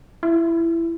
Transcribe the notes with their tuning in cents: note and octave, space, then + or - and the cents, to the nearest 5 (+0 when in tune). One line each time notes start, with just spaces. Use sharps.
E4 +15